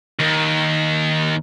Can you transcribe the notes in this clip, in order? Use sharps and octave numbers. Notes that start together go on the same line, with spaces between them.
D#2